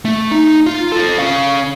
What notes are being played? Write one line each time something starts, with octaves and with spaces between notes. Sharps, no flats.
A3
D#4
F4
F4 A4
C#4 F5